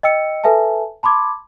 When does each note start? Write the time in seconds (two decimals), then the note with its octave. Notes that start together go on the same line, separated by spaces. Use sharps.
0.03 D#5 G5 E6 C#7
0.44 A4 B4 E5 G#5 A5
1.03 A5 B5 C6 D6 G#6